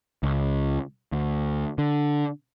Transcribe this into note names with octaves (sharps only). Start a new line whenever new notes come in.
C#2
D2
D3